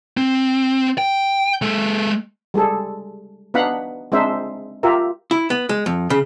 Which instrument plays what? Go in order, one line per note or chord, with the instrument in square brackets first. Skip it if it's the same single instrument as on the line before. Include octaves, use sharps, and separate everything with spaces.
[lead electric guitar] C4
G5
G#3 A4
[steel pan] G3 G#3 G#4 A4
B3 D4 D#4 F5 F#5 B5
G#3 C4 D4 D#4 C5 E5
F4 G4 A#4 E5
[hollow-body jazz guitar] E4
B3
G#3
F2
C#3